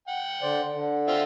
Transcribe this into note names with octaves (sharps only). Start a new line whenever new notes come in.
F#5 G5
D3 C5 D5
D3
C4 F4 E5